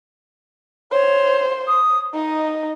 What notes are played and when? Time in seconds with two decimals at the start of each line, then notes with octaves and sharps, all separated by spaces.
0.91 C5 C#5
1.67 D#6
2.14 D#4 D#5